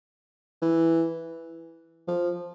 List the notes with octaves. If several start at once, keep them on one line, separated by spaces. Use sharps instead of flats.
E3
F3